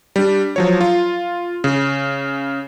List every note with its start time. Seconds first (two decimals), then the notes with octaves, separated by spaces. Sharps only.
0.16 G3 D4
0.56 F3 F#3 C#5
0.81 F4
1.64 C#3